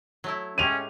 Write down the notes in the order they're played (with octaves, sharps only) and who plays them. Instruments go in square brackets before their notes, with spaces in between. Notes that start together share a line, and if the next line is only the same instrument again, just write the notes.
[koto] F#3 A3 E4
[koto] A2 G#3 G4 [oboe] C#4 [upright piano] D#7 F7